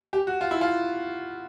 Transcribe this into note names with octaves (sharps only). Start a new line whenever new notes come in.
G4
F#4
F4
E4
F4